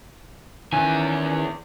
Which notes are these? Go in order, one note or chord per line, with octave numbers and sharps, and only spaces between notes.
E2 D#3 E3 C#4 G#5